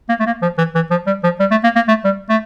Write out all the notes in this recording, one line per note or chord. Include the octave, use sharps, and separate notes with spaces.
A#3
A3
A#3
F3
E3
E3
F3
G3
F3
G3
A3
A#3
A#3
A3
G3
A3